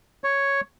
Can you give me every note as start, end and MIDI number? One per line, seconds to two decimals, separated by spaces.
0.24 0.61 73